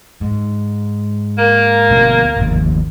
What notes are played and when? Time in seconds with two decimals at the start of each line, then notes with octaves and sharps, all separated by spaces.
0.21 G#2
1.38 A#3
1.90 D2 B2
2.37 G1 D#2